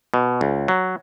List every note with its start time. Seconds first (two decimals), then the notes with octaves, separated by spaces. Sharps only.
0.14 B2
0.41 C#2
0.68 F#3